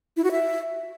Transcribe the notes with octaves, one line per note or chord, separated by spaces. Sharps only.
E4
F#4
E5